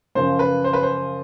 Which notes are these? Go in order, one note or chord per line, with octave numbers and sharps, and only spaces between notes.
F#2 C#3 F3 C5
B4
C5
B4
C5